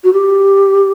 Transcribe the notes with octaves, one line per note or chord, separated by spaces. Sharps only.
F#4
G4